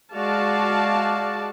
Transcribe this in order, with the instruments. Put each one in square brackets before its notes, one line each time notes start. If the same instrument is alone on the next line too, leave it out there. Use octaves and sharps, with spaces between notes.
[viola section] G#3 F#4 D5 F5 A5